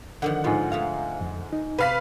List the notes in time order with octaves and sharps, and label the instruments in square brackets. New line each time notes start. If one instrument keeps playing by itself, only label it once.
[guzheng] D3 D#3 F3 [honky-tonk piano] F#5
[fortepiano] G#2 F4 [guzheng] F3 B3
[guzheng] A3 G#4 A#5 [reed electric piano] F5
[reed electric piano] F2
D#4
[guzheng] C3 A5 [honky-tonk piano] B4 F5 B6